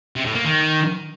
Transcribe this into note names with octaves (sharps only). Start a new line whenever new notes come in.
C3
A2
A#3
D#3